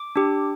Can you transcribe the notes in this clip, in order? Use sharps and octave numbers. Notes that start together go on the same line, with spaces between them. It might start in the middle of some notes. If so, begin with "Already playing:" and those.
Already playing: D6
D4 G4